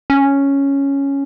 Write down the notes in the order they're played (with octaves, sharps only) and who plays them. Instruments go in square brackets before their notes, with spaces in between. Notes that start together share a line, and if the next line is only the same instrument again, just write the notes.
[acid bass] C#4